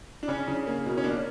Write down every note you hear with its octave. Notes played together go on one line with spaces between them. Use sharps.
D4
C#3 C#4
C#3
A#3
B2
C#4
A#3 D4